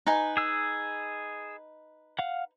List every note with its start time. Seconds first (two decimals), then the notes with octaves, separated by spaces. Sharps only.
0.07 D#4 B4 G#5
0.37 G#4 E6
2.19 F5 F#5